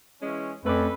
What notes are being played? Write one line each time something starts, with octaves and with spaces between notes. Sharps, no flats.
E3 G#3 C#4
F2 A3 C#4 A4 B4 B5 D6